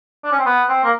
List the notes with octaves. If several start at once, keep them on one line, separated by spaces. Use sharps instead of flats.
D4
C#4
C4
B3
C4
A#3